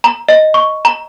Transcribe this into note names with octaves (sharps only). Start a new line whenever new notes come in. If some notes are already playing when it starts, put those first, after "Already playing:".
A#5
D#5
C#6
A#5